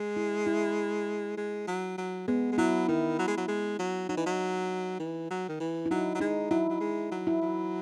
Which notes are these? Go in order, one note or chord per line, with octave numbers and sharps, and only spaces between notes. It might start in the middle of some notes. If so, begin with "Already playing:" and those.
Already playing: G#3
E4
E4
G#3
F#3
F#3
G#3 B3
G#3
F#3 E4
D#3 E4
F#3
G#3
F#3
G#3
F#3
F#3 D#4
E3
F#3
E3
F#3
D#3
E3
E4
F#3 D#4
F#3
G#3 D#4
F#3 E4
F#3
G#3
F#3
E4
F#3